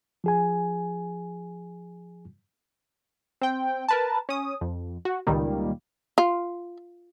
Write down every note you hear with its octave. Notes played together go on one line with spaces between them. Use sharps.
F3 G#4 G#5
C4 G5
A#4 B4 A5
C#4 D#6
F2
F#4
C#2 A#2 D#3 G3 A#3
F4